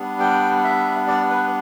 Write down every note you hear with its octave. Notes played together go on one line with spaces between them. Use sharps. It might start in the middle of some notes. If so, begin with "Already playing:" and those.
Already playing: G3 B3 D4
G5
E5
D5
B4